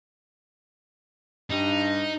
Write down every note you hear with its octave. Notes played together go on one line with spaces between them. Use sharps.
G2 D#4